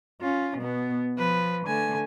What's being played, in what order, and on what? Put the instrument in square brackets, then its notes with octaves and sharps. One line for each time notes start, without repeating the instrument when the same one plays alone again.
[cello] C#4 F4
B2 B3
[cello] F3 [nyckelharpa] B4
[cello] D3 A3 [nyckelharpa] G#5